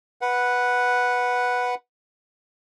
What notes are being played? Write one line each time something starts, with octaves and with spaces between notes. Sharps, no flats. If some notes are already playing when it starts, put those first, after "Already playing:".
B4 F#5